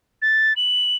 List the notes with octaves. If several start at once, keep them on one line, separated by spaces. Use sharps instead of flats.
A6
F#7